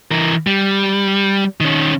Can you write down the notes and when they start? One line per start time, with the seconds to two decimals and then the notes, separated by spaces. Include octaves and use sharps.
0.11 E3 A#4
0.47 G3
1.60 D#3 C#4